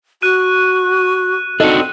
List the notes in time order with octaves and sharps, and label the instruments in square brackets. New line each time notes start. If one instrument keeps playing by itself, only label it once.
[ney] F#4 [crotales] F#6 D#7
[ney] C4 [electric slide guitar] D4 D#4 F#4 [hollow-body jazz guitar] A4 D#5